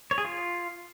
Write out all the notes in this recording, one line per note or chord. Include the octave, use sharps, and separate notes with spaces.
C#5
G#4
F4